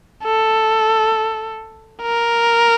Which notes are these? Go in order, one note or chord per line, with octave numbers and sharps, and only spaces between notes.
A4
A#4